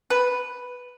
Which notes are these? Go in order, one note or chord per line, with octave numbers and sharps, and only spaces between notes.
B4